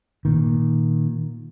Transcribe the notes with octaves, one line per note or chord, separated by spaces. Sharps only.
A#2 D#3